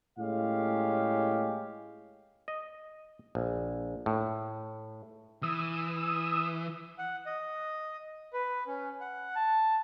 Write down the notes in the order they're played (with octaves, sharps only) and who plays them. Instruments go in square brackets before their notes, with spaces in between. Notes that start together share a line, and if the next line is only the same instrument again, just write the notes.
[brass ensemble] A2 G#3 C#4 G4 F5
[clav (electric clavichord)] D#5
A#1
A2
[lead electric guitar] E3 [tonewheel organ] D#6 E6
[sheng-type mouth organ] F#5
D#5
B4
C#4
F#5
A5